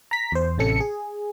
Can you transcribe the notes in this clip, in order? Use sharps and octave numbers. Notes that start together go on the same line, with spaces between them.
A#5 B6
E2 C5
A1 C3 C#4 A4 C#7
G#4